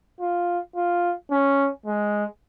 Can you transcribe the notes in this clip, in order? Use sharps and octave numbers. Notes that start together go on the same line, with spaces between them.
F4
F4
C#4
G#3